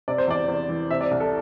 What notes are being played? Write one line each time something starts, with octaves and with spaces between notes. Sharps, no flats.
C3 D5
C5
E2 D5
E2
E3
C3 E5
D5
C2
A4